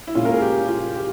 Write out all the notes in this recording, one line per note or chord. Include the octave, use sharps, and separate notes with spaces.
E4
A#2 G#3 C#4 F4
A#4
G#4
G4
F4
G4